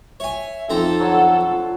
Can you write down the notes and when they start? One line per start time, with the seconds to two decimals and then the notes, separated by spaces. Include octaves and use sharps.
0.20 C#5 E5 G#5
0.70 F2 C4 D#4 A4 A#5
1.00 D3 F#3 C#5
1.39 F4